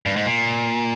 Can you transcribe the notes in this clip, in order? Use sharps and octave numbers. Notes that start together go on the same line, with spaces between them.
G2
G#2
A#2